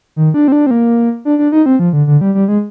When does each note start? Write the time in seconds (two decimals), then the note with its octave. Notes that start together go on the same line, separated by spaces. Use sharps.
0.16 D#3
0.34 D4
0.48 C4
0.52 D4
0.66 C4
0.71 A#3
1.25 D4
1.39 D4
1.52 D#4
1.66 C4
1.79 F3
1.93 D3
2.07 D3
2.21 G3
2.35 G3
2.48 G#3